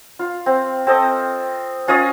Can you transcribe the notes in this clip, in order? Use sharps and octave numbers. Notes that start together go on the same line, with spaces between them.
F4
C4
C4 A4 D#5
C#4 F4 C#5 D#5